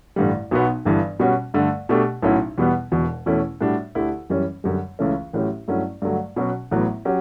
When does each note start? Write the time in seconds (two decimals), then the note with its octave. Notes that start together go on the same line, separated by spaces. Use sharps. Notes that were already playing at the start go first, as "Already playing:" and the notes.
0.16 A1 G2 D3 G3
0.51 B1 B2 F#3 B3
0.85 G1 G2 E3
1.20 B2 G3 C#4 F#4
1.54 G2 D3 A3
1.89 B2 A3 D4 G4
2.22 B1 A2 F#3 C#4 E4
2.58 E2 B2 G3 B3
2.92 E1 E2 B2
3.26 E2 B2 A3 C#4 E4
3.61 A2 G3 D4 F#4
3.95 D2 D3 A3 E4 G4
4.30 F#2 E3 G3 C#4
4.64 F#2 D3 G3
4.99 C#2 C#3 E3 A3 C#4
5.33 A1 A2 F#3 C#4 G4
5.68 G2 F#3 A3 C#4 E4
6.02 G2 D3 F#3 A3
6.36 B2 F#3 C#4 F#4
6.71 A1 A2 F#3 B3
7.05 F#3 C#4 G4